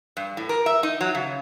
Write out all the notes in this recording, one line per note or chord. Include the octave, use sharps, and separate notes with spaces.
G2
A2
A#4
E5
D#4
F#3
C#3